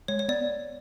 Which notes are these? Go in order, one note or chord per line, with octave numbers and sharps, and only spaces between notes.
G#3 C#5
C#5
B3 D5